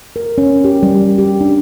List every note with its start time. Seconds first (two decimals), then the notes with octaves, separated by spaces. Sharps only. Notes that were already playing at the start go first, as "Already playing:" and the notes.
0.16 A#4
0.38 C#4
0.64 G4
0.83 G3
1.18 G4
1.41 D4